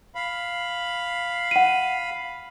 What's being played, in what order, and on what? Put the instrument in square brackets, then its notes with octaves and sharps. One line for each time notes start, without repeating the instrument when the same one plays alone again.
[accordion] F5 B5
[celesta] F#5 D#7